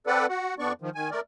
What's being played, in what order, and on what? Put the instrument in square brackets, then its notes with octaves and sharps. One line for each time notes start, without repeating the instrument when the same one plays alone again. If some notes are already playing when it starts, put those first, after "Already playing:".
[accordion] C4 A4 B4 D5 F#5
F#4 F#5
F2 B3 D4 D5 C#6
D#3 F3
D#3 G#5
A3 A#4 D5